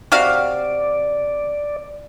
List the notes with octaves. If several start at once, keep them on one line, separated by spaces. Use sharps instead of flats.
C3 F#4 D5 F5